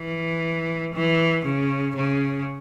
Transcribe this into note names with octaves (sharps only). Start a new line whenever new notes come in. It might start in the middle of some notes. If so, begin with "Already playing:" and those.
Already playing: E3
E3
C#3
C#3